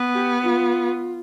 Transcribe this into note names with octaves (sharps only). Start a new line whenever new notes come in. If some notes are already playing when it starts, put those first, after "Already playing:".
Already playing: B3
G4
F4